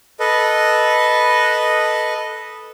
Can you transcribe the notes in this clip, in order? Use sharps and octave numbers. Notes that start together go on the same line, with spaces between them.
A4 B4 D#5